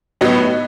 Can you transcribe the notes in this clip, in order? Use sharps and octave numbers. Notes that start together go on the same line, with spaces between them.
A2 F#3 B3 D#4